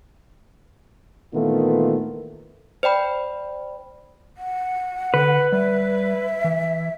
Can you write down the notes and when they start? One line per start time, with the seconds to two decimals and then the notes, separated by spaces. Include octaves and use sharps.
1.33 A#2 D#3 E3 A3 B3 F4
2.83 C5 D5 G5 B5
4.37 F#5
5.14 D3 B4
5.52 G3 E5
6.44 E3